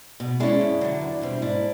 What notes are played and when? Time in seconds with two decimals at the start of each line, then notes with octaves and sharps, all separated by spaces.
0.20 B2
0.40 G#3 C#4 D4 E4
0.61 F#2
0.81 D3 F#3
1.01 E2
1.21 B2 G3 C4
1.42 G#2 D4 E4